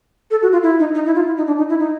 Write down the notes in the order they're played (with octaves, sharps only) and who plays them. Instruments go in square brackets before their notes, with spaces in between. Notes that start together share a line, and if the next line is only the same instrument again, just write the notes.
[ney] A4
F#4
F4
E4
D#4
D#4
E4
F4
E4
D#4
D4
D#4
E4
D#4